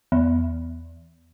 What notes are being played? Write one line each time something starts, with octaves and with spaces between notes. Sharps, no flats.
E2